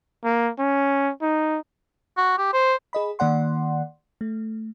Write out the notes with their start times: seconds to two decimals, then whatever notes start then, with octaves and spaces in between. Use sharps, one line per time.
0.24 A#3
0.59 C#4
1.22 D#4
2.17 F#4
2.38 G4
2.53 C5
2.93 G#4 D#5 B5
3.19 D#3 A#3 D5 F#5 C6
4.21 A3